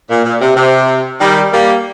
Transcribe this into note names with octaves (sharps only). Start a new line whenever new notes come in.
A#2
A#2
C3
C3
D#3 G3
G3 A#3